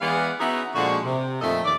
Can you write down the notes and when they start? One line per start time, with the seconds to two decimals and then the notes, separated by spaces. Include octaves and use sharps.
0.01 E3 G#3 B3 G#4 D5 F5
0.39 B3 C#4 D#4 E4 F#4 G#4
0.75 A#2 D3 F3 G#3 F#4
1.04 C3
1.41 F2 A#2 D#3 A3 A4 D#5
1.65 D#2 D5